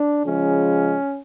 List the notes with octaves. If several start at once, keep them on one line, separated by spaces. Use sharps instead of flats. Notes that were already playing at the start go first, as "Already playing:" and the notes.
Already playing: D4
C#3 F3 G#3 C#4